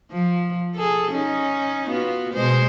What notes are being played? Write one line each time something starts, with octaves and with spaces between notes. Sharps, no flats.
F3
G#4 A4
C#4 D#4
B3 F4 F#4
B2 G#3 C5